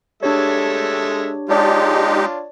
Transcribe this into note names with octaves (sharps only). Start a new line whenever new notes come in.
G#3 D4 G4 A4 C#5 E5
G#3 D4 D#4 F4 G4 C#5 D5 A5